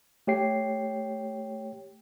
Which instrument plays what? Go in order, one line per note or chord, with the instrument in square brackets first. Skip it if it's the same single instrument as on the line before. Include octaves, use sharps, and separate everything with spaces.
[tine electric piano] A3 G4 C#5 G5 C7